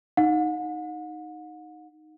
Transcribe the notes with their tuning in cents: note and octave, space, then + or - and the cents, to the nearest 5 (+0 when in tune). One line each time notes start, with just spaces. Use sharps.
D#4 +0 F#5 -40